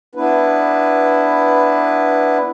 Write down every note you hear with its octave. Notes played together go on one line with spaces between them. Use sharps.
B3 D4 E4 B4